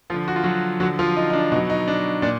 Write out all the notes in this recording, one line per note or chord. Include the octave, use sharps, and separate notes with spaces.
D3 F3 F4
F#4
F4
F#3 F#4
D3 F3 F#3 F#4
F3 F4
D#4
D#4
D4
B2 F#3 D#4
D#4
D4
A#2 D4 D5